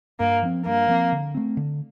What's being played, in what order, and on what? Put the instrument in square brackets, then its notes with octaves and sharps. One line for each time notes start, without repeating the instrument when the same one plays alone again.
[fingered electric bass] G2 [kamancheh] A#3
[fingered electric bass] F3 C4
[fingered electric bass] G2 [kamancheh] A#3
[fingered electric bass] F3 C4
D3
A3 C4
D3